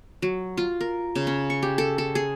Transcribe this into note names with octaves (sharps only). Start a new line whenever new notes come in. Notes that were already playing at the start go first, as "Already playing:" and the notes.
F#3
F4
A#4
C#3
C#4
C#6
G4
A4
A4
G#4